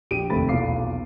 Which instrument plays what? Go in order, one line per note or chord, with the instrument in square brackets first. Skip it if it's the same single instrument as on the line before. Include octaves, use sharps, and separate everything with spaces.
[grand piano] A#1 G4 D7 D#7
F1 D#2 A3 C4 B5 A6
B1 E2 A#2 F5 D6 C7